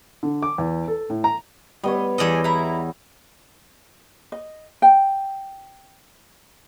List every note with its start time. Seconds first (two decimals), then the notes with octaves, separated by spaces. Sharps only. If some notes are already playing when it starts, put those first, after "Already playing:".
0.23 D3
0.43 D6
0.58 E2
0.88 A4
1.10 A2
1.24 A#5
1.84 G3 B3 C#5 D#5
2.18 E2 A4 D5 D#5 G#5
2.44 E4 A#5
4.32 D#5
4.82 G5